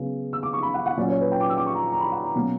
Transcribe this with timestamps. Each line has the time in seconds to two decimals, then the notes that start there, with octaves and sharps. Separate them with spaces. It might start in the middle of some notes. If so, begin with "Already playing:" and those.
Already playing: C#3 F#3 B3
0.33 E6
0.43 D6
0.53 C#6
0.63 B5
0.74 F#5
0.86 F#5
0.97 A#2 F#3 C#4 D5
1.09 C#5
1.21 B4
1.32 G5
1.40 D6
1.50 E6
1.57 D6
1.66 C#6
1.75 A#5
1.92 A#5
2.01 B5
2.12 F#5
2.24 A#5
2.35 B2 F#3 A#3 C#4